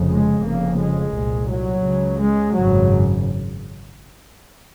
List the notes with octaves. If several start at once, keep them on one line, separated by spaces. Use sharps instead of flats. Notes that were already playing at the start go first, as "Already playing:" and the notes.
Already playing: F1 F2 C#3
G#3
F1 F2 C#3 A#3
G#3
C2 A#2
F#3
C#2 C#3
G#3
G#1 F#2 C#3 F#3